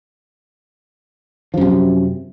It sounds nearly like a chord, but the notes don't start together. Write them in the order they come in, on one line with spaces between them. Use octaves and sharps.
F3 F#2 C3